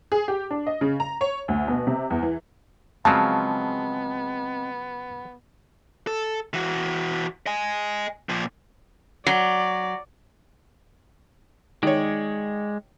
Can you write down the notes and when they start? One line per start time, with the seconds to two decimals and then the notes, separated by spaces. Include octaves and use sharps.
0.12 G#4
0.28 G4
0.51 D4
0.67 D#5
0.81 C#3
1.00 A#5
1.21 C#5
1.48 D2
1.68 B2
1.87 C3
2.10 E2
2.23 E3
3.05 C#3 F3 F#3 G#3 B3 C4 F5 A5
6.07 A4
6.54 E3 F#4
7.46 D#5 G#5
8.29 A#2 F3
9.27 F#3 D5
11.83 D#3 G#3 C#5 D5